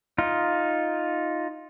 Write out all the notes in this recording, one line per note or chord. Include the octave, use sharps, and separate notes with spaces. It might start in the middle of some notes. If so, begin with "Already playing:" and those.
D#4 F4